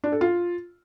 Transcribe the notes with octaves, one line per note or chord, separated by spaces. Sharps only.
D4
A4
F4